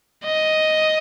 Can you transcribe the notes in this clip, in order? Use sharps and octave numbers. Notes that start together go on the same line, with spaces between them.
D#5